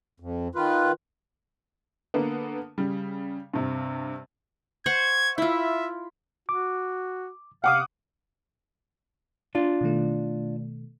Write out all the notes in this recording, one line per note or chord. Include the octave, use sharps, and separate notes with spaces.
F2
D#3 F4 B4
D3 A#3 B3
C#3 G3
G2 C3
C5 F#5 C#6 G#6
E4 F4 E5
F#4 D6
C3 F5 F#5 D6 D#6
D4 F4
B2 D#3 A3